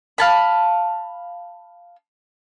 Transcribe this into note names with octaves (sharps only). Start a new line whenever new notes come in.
F5 A5 B5